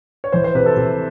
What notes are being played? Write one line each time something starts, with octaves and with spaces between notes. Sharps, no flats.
C#5
E3 C5
C5
C3 B4
A4
C3